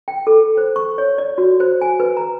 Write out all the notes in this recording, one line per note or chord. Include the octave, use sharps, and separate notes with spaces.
G5
A4
C5
C#6
C#5
D5
F#4
C5
G#5
B4
A#5